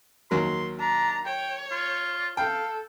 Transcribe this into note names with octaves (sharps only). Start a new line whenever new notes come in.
D#2 F#3 A#4 C6
D4 A#5
C#5 G5
F4
A4 F5 G5